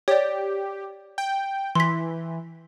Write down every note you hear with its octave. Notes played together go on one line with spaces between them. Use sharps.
G4 C#5 D5
G5
E3 C6 B6